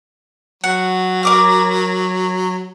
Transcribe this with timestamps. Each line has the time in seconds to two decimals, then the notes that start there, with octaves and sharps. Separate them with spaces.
0.64 F#3 F#5
1.23 A#4 D6 F6